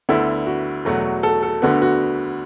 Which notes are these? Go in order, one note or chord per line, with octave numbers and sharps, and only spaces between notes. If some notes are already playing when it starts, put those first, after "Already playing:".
D2 D3 B3 E4
F#4
E2 B2 F#3 A3 F#4
A4
A4
D2 D3 B3 F#4
F#4